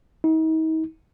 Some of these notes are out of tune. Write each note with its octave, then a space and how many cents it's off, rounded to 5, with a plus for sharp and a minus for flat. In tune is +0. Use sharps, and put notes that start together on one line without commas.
D#4 +40